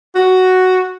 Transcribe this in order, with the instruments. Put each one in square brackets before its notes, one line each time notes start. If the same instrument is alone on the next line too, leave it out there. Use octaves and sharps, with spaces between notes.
[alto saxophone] F#4